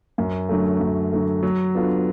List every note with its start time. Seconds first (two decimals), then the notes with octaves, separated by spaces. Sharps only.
0.18 F#2
0.49 D3 F#3 A3
0.81 F#2
1.12 D3 F#3 A3
1.43 F#3
1.75 B3 D4 F4 A4